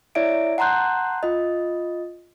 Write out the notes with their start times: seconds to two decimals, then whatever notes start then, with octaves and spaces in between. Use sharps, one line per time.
0.15 E4 C#5 D5 E5 D7
0.58 F#5 A5 A#5 C6 F#6 G6
1.23 F4 D#5